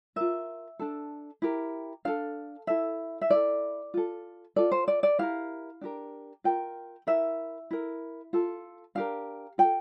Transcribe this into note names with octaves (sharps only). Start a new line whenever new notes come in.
F4 A#4 E5
D4 A4
E4 G4 A#4
D4 A4 F5
E4 A4 E5
E5
E4 A4 D5
F4 A4
F4 A4 D5
C5
D5
D5
E4 G4 A#4 F5
D4 G4 A#4
F4 A#4 G5
E4 A#4 E5
E4 A#4
F4 A4
D4 G4 A#4 F5
F4 A4 G5